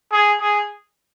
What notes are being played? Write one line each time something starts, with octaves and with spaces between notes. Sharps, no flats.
G#4
G#4